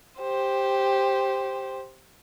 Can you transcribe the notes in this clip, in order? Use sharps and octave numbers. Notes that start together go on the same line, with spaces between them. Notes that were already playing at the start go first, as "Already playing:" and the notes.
G4 C5